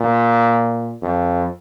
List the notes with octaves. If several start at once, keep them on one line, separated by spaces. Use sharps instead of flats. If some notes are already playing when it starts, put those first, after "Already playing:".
Already playing: A#2
F2